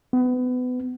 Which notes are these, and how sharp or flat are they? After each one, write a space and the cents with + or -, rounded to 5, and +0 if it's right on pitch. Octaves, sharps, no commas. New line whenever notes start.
B3 +25